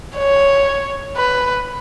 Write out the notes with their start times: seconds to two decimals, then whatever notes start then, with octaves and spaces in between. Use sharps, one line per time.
0.16 C#5
1.16 B4